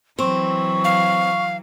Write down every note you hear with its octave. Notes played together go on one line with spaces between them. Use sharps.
E3 F#3 C4 C#6
F5